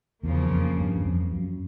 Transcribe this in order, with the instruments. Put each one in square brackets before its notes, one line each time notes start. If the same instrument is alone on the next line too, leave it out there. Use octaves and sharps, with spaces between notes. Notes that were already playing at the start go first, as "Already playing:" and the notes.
[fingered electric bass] E2 [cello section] C#3 F3 A#3
[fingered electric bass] F2
G2
E2
F2
F#2